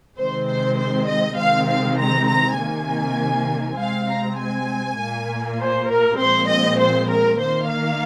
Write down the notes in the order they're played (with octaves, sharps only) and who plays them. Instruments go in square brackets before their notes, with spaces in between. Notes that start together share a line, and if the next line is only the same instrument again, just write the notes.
[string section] C3 D#3 G#3 C4 C5
C5
C5
D#5
C3 D#3 G#3 C4 F5
F5
A#5
A#5
C3 D#3 A#3 G#5
C3 G#3 C4 F5
A#5
G#5
A#2 A#3
C5
A#4
A#2 F3 G#3 C4 C5
D#5
C5
A#4
D#3 A#3 C5
F5